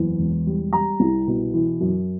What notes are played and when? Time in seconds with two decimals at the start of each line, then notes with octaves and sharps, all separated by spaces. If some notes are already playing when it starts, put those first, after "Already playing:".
Already playing: F#1 E2
0.19 E1
0.47 G3
0.73 G3 A#5
1.00 C2
1.28 B2
1.54 E3
1.81 F#2